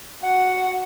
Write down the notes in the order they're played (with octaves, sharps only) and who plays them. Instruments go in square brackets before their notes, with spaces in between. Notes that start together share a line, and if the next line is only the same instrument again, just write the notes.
[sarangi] F#4 [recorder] F#5